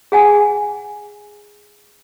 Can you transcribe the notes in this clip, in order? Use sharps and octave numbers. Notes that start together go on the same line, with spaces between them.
G#4 F#5 G#5